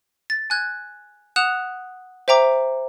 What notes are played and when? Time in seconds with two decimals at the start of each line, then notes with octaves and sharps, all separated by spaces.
0.30 A6
0.50 G#5 F#6 G#6
1.36 F#5 D#6 F#6 E7 F7
2.28 C5 E5 G5 A#5 D6